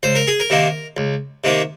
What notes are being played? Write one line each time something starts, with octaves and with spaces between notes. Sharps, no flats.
C#2 C5
A#4
G#4
A#4
C3 D#3 A#3
C#2
C3 D#3 A#3